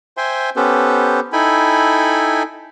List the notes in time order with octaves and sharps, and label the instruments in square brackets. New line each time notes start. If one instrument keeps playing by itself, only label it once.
[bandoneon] C5 E5 G5 G#5 C6
B3 C#4 G4 A4 B4 C5
D#4 E4 A4 G5 G#5 B5